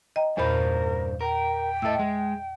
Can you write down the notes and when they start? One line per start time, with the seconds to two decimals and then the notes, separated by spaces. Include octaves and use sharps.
0.16 D#5 G5 A#5
0.37 E2 G2 A#2 A#4 C5 F5 B5
1.21 A#4 G5
1.82 A2 A4 D#5 E5 E6
1.99 G#3